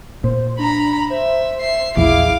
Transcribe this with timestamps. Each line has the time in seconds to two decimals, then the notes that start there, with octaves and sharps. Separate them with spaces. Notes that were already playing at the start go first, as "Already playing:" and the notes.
0.24 A#2 C5
0.59 D4 A#5 B5
1.10 C5 E5
1.60 E5 C7
1.97 A#1 E2 E4 G#4 F5 D6